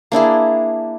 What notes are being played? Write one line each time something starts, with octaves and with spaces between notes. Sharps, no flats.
A#3 D4 E4 G#4